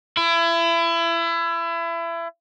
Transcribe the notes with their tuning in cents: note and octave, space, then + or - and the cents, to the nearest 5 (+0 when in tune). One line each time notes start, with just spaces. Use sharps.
E4 +30